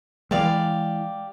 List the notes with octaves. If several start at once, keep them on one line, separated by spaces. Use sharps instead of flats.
E3 G#3 G4 D5 F5